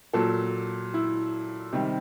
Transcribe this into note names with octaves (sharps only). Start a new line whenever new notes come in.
A#2 F#3 A4
E4
C3 D#3 G3